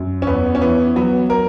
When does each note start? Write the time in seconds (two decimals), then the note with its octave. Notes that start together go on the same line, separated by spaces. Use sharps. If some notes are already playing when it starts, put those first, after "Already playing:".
Already playing: F#2
0.22 C#4
0.27 E2 B3
0.55 C#4
0.61 E3 B3
0.96 F#3 B3
1.30 A#4